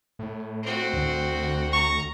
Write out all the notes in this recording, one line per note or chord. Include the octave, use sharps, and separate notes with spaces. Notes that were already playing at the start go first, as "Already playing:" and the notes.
A2
C4 F#4
D2
A#5 C#6